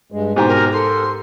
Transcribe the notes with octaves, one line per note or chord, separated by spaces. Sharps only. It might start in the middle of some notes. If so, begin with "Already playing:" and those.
G2 G#3
G#2 B2 G4 C5 G#5 A#5
A#4
A4 A#4 C6